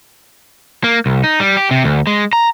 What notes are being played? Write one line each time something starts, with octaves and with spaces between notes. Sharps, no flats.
A#3
C2
D#4
G3
G4
C3
D2
G#3
A#5